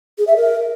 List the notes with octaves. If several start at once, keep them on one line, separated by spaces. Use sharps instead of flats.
G#4
E5
A#4